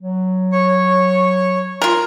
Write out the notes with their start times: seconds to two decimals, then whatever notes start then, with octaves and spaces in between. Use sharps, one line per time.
0.01 F#3
0.53 C#5 C#6
1.82 F4 A#4